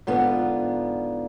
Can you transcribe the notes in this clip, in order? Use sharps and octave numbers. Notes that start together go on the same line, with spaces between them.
G#2 D3 B3 F4